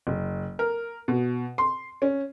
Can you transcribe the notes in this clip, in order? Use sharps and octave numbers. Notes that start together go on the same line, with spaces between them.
F#1
A#4
B2
C6
C#4